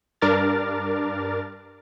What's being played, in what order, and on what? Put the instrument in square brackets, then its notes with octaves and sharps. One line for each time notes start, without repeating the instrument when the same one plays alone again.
[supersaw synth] G2 D4 A#4 D6 F6 A6